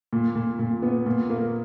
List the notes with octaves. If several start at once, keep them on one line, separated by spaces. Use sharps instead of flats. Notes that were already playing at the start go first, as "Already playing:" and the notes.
A#2
A#2
A#2
B3
A#2
A#3